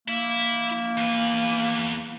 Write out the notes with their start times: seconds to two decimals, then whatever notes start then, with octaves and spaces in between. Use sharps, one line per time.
0.08 A#3 E4
0.97 E2 B4